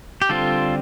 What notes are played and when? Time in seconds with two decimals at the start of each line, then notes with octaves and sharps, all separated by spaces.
0.22 G4
0.29 D3 G3 C4 F4 A4